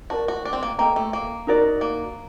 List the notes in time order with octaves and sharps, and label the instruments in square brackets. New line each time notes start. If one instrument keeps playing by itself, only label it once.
[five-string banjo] F#4 [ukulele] A#4 D5 A5
[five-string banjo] F#4
D4
C4
A#3
[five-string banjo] A#3 [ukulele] A4 D#5 G5 A#5
[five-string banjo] A3
A#3
[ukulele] D#4 F#4 A#4 D5
[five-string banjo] A#3